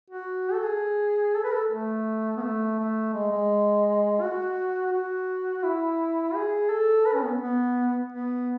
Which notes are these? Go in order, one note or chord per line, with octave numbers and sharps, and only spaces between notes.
F#4
A4
G#4
A4
B4
A4
A3
B3
A3
A3
G#3
G#3
F#4
F#4
E4
G#4
A4
B4
C#4
B3
B3
B3